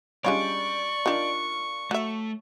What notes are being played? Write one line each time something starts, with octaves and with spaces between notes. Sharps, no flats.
G3 G#3 C#4 D4 F4 C#5 D5 C#6
D4 D#4 F4 G4 A#4
F#3 A3 E5